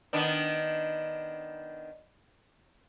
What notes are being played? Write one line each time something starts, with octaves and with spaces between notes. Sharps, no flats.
D#3 B3 D4